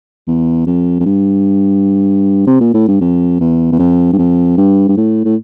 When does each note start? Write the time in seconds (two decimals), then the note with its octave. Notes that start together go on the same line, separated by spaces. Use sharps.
0.28 E2
0.67 F2
1.00 F2
1.06 G2
2.47 C3
2.61 A#2
2.74 A2
2.88 G2
3.01 F2
3.40 E2
3.72 E2
3.79 F2
4.13 G2
4.18 F2
4.57 G2
4.88 G2
4.97 A2
5.25 A2